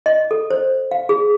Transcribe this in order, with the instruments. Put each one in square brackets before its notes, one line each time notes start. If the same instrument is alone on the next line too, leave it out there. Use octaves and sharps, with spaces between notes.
[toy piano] D#5
A4
C5
F5
G#4